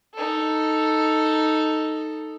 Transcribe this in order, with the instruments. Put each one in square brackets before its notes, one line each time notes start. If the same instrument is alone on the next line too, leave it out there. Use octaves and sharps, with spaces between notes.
[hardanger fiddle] D#4 A4